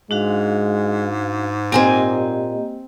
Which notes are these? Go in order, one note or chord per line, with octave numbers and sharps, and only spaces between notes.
G#2 G#3 D4 F#4 F5
A#2 A#3 C4 G4 D#5 G#5 A#5